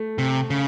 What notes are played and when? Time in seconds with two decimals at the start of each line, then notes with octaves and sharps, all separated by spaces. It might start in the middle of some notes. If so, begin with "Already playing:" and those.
Already playing: A3
0.18 C3
0.50 C#3